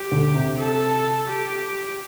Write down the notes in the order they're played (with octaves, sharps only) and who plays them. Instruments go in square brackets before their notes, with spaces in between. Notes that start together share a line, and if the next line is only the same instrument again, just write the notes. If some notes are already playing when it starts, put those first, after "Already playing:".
Already playing: [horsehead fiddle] G4
[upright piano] D2 D3
C3
[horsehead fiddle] A4
G4